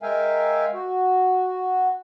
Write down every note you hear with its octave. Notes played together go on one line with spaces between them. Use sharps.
G#3 A#4 E5 F5 G5 G#5
F#4